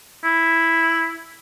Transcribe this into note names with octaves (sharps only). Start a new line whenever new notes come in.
E4